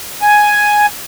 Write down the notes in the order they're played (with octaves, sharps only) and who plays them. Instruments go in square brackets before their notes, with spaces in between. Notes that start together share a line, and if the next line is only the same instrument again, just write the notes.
[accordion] G#5